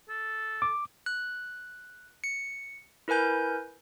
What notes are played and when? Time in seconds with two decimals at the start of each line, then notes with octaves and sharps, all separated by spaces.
0.09 A4
0.62 D6
1.06 F#6
2.24 C#7
3.08 E4 A#4 B4 G#5 G6